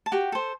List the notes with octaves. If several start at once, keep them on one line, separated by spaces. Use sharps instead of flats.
A5
F#4 G4 G5
A4 C5